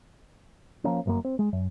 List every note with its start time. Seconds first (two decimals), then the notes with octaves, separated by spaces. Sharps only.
0.84 F3 A#3 C#4
1.06 G1 F#2 A#3
1.25 C4
1.39 G#3
1.53 F#2